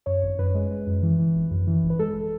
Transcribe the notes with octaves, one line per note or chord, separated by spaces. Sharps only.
F#2 C#5
G#1
F#2 B4
G#3
G#3
F#2
E3
E3
G#1
F#2
E3
G#1
B4
G#3 A4